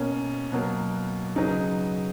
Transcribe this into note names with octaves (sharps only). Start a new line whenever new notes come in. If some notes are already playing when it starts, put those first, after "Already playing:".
Already playing: B2 A#3 C#4
B2 F#3 A#3
C#3 F#3 B3 D#4